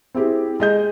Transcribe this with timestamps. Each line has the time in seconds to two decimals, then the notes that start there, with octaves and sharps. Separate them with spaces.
0.14 C4 E4 G4 G#4
0.60 G#3 D#5 G6